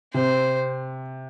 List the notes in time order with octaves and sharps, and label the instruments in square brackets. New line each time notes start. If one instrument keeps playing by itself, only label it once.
[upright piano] C3 [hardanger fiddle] C5